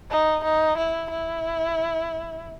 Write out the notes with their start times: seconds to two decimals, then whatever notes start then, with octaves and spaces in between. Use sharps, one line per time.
0.10 D#4
0.44 D#4
0.77 E4
1.10 E4